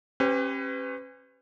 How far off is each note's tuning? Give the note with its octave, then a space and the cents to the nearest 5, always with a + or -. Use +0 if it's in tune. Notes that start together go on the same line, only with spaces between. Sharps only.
C#4 -35 G4 +0 B4 +30